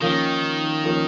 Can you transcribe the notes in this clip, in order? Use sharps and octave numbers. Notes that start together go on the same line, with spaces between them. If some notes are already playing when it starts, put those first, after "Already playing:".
D#3 F3 A#3 C#4
F3 A#3 C#4